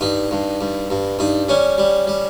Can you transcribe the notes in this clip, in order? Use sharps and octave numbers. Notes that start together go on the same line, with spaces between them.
G2 D#4
G2
G2
G2
G2 D#4
G3 C#4
G3
G3